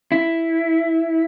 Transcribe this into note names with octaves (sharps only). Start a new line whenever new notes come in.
E4